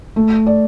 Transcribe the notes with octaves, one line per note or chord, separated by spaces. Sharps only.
A3
D5